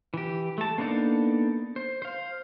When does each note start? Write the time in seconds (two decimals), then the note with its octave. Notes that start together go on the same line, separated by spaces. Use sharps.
0.14 E3 G4
0.58 A3 A5
0.78 A#3 B3 D4 D#4 A4
1.76 C5
2.02 C5 F5